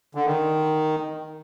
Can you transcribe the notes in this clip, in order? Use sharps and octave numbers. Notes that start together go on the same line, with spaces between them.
D3
D#3